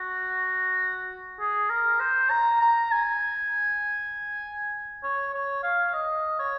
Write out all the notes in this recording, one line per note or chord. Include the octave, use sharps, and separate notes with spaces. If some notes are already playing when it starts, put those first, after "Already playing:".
Already playing: F#4
G#4
A#4
C5
A#5
A#5
G#5
C#5
C#5
F5
D#5
C#5